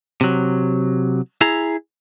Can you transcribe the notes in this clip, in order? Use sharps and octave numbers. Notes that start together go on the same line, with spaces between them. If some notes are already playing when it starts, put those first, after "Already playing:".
C3 F#3
E4 G#4 A#5